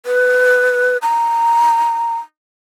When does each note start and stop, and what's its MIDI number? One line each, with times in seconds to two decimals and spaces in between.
0.06 0.97 71
1.02 2.16 82